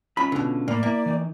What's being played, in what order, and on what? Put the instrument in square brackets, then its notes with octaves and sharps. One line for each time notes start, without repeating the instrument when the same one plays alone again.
[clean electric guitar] C#4 F4 [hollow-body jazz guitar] B5
[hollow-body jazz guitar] B2 D3
[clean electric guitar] A2 B5 [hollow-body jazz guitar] A#3 [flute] D5
[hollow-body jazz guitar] A#3 [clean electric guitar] E4
[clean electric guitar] E3 D#4